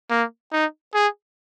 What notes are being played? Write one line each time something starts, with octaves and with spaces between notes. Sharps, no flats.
A#3
D#4
G#4